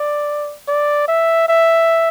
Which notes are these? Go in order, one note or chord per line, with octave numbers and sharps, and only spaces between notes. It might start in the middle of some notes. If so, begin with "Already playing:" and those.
Already playing: D5
D5
E5
E5